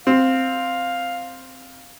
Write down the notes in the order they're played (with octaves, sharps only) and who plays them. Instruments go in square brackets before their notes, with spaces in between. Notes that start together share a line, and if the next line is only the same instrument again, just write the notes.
[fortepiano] C4 [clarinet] F5